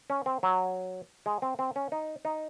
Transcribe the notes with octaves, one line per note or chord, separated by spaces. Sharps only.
C#4
C4
F#3
G#3
C4
C4
C#4
D#4
D#4